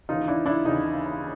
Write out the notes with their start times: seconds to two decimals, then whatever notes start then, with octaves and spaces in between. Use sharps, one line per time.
0.09 D#2 C#3 E3 D#4 F4
0.28 D4 E4
0.46 D4 E4
0.65 D#2 C#3 E3 D#4